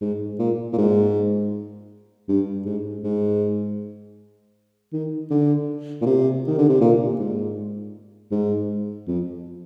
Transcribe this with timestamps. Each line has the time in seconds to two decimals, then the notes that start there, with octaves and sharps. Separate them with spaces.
0.01 G#2
0.39 A#2
0.73 A#2
0.78 G#2
2.29 G2
2.65 G#2
3.04 G#2
4.93 D#3
5.30 D3
6.01 A#2
6.06 C3
6.47 D#3
6.58 D3
6.69 C3
6.81 A#2
7.19 G#2
8.31 G#2
9.07 F2